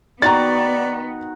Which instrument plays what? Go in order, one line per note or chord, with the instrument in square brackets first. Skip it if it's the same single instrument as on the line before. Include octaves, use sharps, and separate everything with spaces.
[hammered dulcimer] D#3 F#4 [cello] B3 [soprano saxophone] D5 [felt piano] A#5 A6